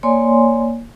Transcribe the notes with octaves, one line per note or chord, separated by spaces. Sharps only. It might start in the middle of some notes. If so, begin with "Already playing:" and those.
A#3 C#5 D5 G#5 C6